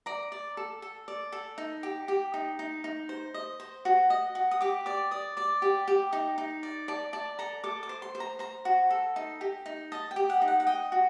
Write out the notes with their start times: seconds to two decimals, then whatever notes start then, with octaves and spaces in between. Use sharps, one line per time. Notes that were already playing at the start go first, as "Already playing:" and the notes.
0.06 D5 A#5
0.32 D5
0.57 A4
0.82 A4
1.08 D5
1.32 A4
1.58 D#4
1.83 G4
2.08 G4
2.34 D#4
2.59 D#4
2.84 D#4
3.09 C5
3.34 D#5
3.60 C5
3.85 F#4
4.10 D#5
4.35 F#4
4.51 D#6
4.61 G4 D6
4.86 D5 D6
5.11 D5 D#6
5.37 D5 D6
5.62 G4
5.88 G4
6.13 D#4
6.38 D#4
6.63 D5
6.88 D5 A5
7.13 D5 A5
7.39 A4 A#5
7.64 A4 D6
7.83 D6
7.89 C5
8.02 C6
8.15 C5
8.20 A#5
8.39 C5 A#5
8.65 F#4
8.90 A4
9.16 D#4
9.41 G4
9.66 D#4
9.92 D#5 A5
10.11 G5
10.16 G4
10.30 F#5
10.42 D#4
10.48 F#5
10.60 F#5
10.67 D#5 G5
10.92 F#4